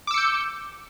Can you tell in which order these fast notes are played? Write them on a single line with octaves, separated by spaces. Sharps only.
D6 E6 C#7 G6